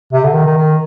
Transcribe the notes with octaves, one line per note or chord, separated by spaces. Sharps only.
C3
D3
D#3
D#3
D#3